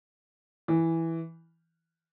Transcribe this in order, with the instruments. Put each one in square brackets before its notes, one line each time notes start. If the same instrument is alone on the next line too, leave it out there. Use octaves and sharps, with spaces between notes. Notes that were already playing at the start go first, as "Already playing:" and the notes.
[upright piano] E3